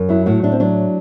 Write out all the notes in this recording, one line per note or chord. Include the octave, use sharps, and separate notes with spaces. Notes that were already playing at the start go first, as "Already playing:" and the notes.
Already playing: F#2
F#3 E4
A2 F#4
A2 D4
C4
F#3 D4